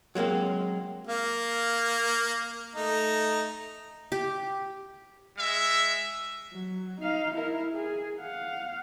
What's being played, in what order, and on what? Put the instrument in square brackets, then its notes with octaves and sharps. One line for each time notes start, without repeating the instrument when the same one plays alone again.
[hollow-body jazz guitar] F#3 G#3 A#3 C4
[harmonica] A#3 F5
A3 D#4
[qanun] G4
[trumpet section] G#3 E5
[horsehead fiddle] F#3
D#4 F5
E4 A#4
G#4
F5 F#5